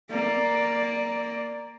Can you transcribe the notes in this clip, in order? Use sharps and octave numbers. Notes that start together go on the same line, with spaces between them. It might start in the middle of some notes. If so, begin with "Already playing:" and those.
A#3 D5